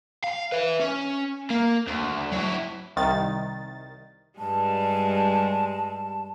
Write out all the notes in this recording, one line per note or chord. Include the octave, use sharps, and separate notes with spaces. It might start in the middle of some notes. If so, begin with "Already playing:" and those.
F5
E4 B4
C#4
A#3
D2
F#3 E4
C2 D#3 A6
G2 G3 G#3 A5